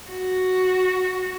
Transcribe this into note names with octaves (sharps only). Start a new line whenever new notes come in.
F#4